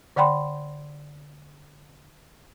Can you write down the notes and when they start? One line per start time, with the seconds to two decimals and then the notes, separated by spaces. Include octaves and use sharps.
0.16 D3 D5 F#5 G5 B5 C6